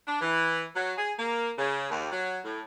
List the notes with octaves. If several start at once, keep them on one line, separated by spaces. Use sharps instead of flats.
D4
E3
F#3
G#4
A#3
C#3
D#2
F#3
A2